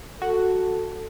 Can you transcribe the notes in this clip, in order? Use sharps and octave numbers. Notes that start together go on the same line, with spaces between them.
F#4 A4